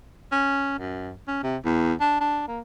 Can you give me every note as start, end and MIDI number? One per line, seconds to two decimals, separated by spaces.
0.32 0.78 61
0.79 1.13 42
1.28 1.41 61
1.43 1.57 48
1.65 1.93 40
2.01 2.17 62
2.21 2.43 62
2.48 2.60 58